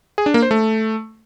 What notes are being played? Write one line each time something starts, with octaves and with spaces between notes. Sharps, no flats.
G#4
D4
A#3
C5
A3